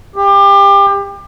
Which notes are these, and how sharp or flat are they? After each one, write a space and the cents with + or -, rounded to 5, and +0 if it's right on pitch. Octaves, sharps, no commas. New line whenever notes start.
G4 +25